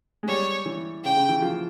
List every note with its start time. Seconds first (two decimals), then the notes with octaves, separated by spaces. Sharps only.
0.23 G#3
0.28 G3 C#5
0.66 E3
1.04 C#3 G5
1.16 C#3
1.29 E3
1.42 F3